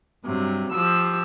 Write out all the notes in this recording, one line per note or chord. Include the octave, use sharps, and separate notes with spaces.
G2 C3 F#3
F3 G4 E6